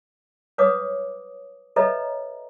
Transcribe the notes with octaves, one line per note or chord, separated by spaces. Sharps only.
B4 C#5 F5 D6 D#6
A4 B4 C#5 D#5 E5 A#5